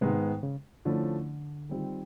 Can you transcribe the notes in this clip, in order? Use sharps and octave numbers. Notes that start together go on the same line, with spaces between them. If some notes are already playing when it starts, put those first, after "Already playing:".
G#2 C3 D#3 G#3 B3
C#3
D3 F3 A3 C#4 E4
D#3 G3 C4 F4